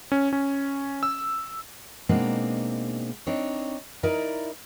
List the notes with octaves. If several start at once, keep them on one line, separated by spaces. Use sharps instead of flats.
C#4
C#4
E6
B2 G#3 A#3 C4 D4 D#4
C4 D4 D#4 C#5
D#4 E4 A#4 D5